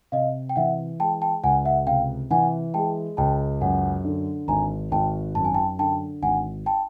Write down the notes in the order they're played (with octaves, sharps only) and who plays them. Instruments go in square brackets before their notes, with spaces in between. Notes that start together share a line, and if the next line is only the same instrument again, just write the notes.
[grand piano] C3 [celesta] D#5 F5
[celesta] G5
[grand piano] E3 [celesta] E5 F#5
[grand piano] G#3 [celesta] G5 A5
[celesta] G5 A5
[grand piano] C#2 [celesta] F#5 G#5
[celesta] E5 F#5
[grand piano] C3 [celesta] F5 G5
[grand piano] E3 [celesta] F#5 G#5
[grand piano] G#3 [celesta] G5 A5
[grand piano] C#2 [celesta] G5 A5
[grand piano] F#2 [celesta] F#5 G#5
[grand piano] D3
[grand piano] G#1 [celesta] G#5 A#5
[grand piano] G#1 [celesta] G5 A5
[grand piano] F#2 [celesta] A5
[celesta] G#5
G5 A5
[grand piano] D3 [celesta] G5 A5
[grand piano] G#1 [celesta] F#5 G#5
[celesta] G5 A5